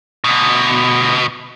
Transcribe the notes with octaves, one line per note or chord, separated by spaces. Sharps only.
D2 B2